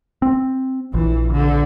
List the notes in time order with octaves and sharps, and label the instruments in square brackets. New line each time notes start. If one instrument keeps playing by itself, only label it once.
[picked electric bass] C4
[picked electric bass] A#1 [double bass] E3
[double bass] D3